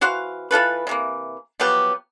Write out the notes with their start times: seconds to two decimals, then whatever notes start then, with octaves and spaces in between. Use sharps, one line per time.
0.01 E3 F#4 C5 F5
0.51 E3 F4 A4 B4
0.87 C3 E3 A#3
1.60 F3 F#3 B3 G4